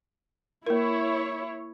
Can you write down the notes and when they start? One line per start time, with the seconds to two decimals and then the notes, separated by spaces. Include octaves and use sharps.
0.67 A#3 E4 A#4 C#5